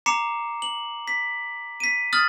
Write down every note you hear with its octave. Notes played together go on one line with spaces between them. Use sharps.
A#5 D6 C7 C#7 E7
F#7
B6
B6 D#7
D#6 F6 A6 F#7